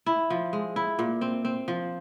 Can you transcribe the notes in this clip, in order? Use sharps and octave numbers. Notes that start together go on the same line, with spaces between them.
E4
F3
G#3
E4
A#2
C4
C4
F3